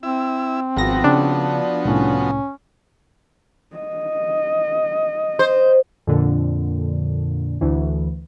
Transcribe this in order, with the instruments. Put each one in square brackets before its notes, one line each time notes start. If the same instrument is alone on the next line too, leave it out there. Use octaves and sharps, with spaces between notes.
[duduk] C4 [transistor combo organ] E4 E6
[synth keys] G#1 A#6 [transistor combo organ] F3 B3 F#4
[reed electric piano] C#3 [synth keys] D4
[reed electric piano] C2 A2 [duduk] C#4
[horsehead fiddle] D#5
[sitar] C5
[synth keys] F2 A#2 D3
D2 E3